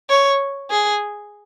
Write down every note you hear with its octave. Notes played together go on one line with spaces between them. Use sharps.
C#5
G#4